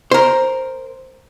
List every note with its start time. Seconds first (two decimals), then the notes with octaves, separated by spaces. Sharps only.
0.11 A#4 C5